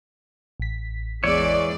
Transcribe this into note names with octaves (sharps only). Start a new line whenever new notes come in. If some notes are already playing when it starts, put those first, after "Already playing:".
A1 B6
E2 E3 G#3 C#5 D5